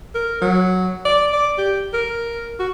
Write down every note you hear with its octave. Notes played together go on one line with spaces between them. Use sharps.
A#4
F#3
D5
D5
G4
A#4
F#4